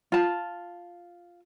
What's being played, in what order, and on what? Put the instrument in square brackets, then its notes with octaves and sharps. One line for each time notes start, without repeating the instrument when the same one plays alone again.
[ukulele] F4 A5